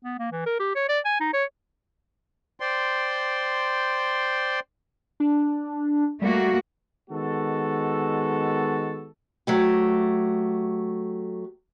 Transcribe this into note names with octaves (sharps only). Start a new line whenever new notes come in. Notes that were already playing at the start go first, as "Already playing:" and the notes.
B3
A#3
E3
A#4
G4
C#5
D5
G#5
D#4
C#5
C5 D5 G5 C6
D4
G3 A3 A#3 F#4
D#3 G#3 B3 F#4 A4
F#3 A3 G4